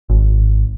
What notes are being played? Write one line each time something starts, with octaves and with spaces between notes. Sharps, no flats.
G#1